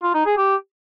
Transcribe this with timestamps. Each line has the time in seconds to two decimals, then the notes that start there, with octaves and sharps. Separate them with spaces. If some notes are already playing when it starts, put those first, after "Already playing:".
0.02 F4
0.14 D#4
0.26 G#4
0.37 G4